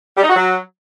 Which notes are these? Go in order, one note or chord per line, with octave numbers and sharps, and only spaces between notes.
G3
D#4
F#4
F#3